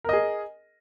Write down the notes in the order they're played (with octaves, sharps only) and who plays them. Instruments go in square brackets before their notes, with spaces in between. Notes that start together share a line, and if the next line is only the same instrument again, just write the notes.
[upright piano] A#4
D#5
G#4